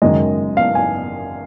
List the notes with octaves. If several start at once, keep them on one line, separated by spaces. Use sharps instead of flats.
F#1 F#2 D#3 G#3 D#5
F5
G#5